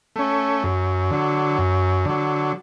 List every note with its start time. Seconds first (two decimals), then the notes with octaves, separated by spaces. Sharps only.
0.16 A3 C#4
0.63 F#2
1.11 D3 F#3
1.58 F#2
2.05 D3 F#3